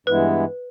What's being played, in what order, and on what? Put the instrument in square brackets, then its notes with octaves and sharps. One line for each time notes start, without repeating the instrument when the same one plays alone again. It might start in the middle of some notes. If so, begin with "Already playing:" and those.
[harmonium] G2 E3 G#3 B3 E4 [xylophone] B4